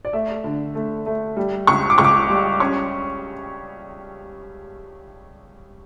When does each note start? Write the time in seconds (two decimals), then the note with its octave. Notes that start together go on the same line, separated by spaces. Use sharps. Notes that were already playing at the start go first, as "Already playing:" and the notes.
0.05 D5
0.13 A3 E5
0.44 D3
0.75 A3
1.06 A3
1.37 G3
1.67 C#2 C#6
1.90 D6
1.98 C#2 C#6
2.05 D6
2.29 G3
2.60 C#4 C#6